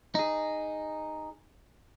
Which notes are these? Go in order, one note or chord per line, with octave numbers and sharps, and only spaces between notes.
D#4 G#4